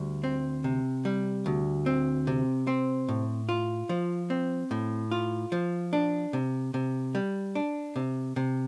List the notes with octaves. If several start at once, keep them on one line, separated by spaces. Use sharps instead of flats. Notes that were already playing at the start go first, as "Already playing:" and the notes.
Already playing: D2 G3
C4
C3
G3
D2
C4
C3
C4
A2
F4
F3
C4
A2
F4
F3
D4
C3
C3
G3
D4
C3
C3